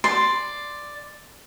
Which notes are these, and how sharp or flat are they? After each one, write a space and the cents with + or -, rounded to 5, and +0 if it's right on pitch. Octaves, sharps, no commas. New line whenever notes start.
D5 +5 C6 +0